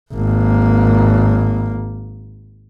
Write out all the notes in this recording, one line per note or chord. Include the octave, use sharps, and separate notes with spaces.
G#1 A#3